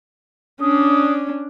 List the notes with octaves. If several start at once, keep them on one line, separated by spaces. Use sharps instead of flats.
C#4 D4 D#6